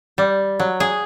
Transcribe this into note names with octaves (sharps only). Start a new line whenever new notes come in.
G3
F#3
G#4